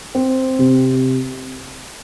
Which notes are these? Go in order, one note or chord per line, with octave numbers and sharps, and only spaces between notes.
C4
C3